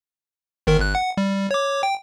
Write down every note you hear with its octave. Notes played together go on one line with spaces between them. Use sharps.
G1 D#3 A#4
G1 F#6
F#5
G3
C#5 D6
G5